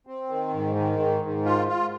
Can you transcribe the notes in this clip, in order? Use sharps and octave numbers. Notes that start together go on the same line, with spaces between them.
C4
D#3
G#2
D#3
G#2
G#2
F4
F4